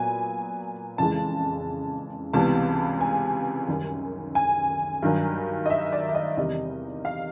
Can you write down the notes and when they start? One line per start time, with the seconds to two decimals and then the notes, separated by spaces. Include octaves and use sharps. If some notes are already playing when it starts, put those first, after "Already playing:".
Already playing: A#2 F#3 B3 G#5
0.98 F2 C#3 E3 G#3 A5
2.33 C#2 C3 E3 G3 B3 A5
3.01 G#5
3.68 F#2 D#3 G3
4.35 G#5
5.03 G2 D#3 F#3
5.66 D#5
5.70 E5
5.92 D5
6.09 E5
6.15 D#5
6.37 E2 C3 D#3 G3 D#5
7.05 F5